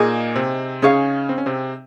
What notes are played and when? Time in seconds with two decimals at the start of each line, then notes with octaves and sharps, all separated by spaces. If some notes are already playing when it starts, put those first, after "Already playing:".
Already playing: A#2 A#3 D#4 G#4 D#5
0.36 C3 C4
0.82 C#3 C#4 D#4 G#4 C#5 F5
1.29 C4
1.38 C#4
1.46 C3 C4